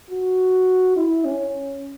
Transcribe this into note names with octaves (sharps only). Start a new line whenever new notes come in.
F#4
E4
C#4